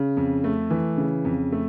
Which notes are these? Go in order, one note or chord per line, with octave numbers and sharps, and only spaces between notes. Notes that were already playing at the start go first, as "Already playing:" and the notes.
Already playing: C#3
F2
A3
E3
C#3
F2
A3